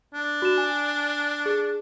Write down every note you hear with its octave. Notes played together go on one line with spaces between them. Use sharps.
D4
F#4 E7
G#5
G#4